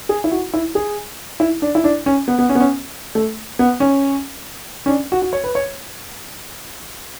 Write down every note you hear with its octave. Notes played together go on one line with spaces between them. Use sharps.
G#4
E4
F#4
E4
G#4
E4
D4
E4
D4
C#4
B3
B3
C#4
B3
C#4
A3
B3
C#4
C#4
D4
F#4
F#4
C#5
B4
C#5